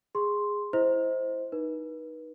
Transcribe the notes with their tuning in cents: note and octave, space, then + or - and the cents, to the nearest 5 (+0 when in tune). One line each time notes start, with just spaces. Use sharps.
G#4 -10 C6 +0
E4 +0 C5 +0 D#5 +35
D#4 +0 B4 -35